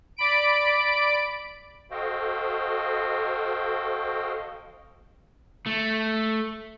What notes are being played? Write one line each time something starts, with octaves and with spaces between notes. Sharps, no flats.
D5 B5 D7
F#4 A4 C5 D#5 F5 G5
A3